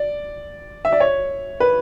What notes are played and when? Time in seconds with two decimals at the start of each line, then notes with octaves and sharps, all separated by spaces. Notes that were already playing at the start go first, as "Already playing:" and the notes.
Already playing: D5
0.85 E5
0.92 D5
1.00 C#5
1.60 B4